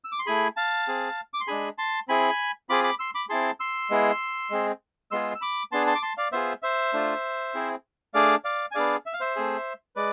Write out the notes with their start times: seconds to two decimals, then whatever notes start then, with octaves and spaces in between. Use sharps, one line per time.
0.04 E6
0.12 D6
0.19 C6
0.26 A3 E4 G#4 G#5 B5
0.57 F5 A5
0.88 C4 G#4
1.34 D6
1.41 C6
1.47 G#3 D4 G#4 G#5 B5
1.78 A5 C6
2.08 C4 E4 G#4 G#5 B5
2.70 C4 F4 G#4 B5 D6
2.84 B5 D6
2.99 C6 E6
3.15 B5 D6
3.29 C4 E4 G#4 A5 C6
3.60 C6 E6
3.90 G#3 B3 E4 G#4
4.50 G#3 C4 G#4
5.11 G#3 B3 F4 G#4 C6 E6
5.35 E6
5.41 B5 D6
5.72 B3 D4 G#4 A5 C6
5.87 A5 C6
5.95 D6
6.02 A5 C6
6.18 D5 F5
6.32 B3 F4 G#4 C5 E5
6.63 C5 E5
6.94 A3 D4 F4
7.55 C4 E4 G#4
8.14 A3 D4 G#4 D5 F5
8.45 D5 F5
8.71 G#5
8.75 B3 D4 G#4 D5 F5
9.06 E5
9.13 F5
9.20 C5 E5
9.36 A3 C4 G#4
9.96 G#3 B4 D5